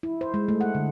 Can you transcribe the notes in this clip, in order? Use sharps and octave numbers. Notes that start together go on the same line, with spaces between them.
E4
C5
G#3
A3
F#5
D3